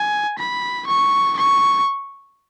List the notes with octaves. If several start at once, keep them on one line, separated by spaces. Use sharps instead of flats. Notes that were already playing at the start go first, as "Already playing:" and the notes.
Already playing: G#5
B5
C#6
C#6